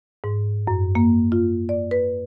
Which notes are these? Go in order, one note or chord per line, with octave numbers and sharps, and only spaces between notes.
G#2
F#2
A#3
F4
D5
B4